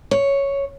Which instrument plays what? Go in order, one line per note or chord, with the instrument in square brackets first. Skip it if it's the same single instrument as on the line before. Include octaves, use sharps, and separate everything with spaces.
[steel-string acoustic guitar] C#5